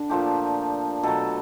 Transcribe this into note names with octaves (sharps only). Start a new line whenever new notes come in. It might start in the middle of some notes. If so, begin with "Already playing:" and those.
Already playing: D3 D4
A#2 F3 A3 G4
B2 F#3 A3 A4